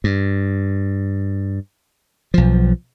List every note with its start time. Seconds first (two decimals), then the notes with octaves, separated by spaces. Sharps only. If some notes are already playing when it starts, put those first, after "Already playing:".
0.04 G2
2.34 B1 F3